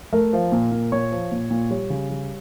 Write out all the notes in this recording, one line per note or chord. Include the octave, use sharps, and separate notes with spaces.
A3 A#4
F3
A#2
A#2
A#2 C#5
F3
A#2
A#2
G3 C#5
C#3
G3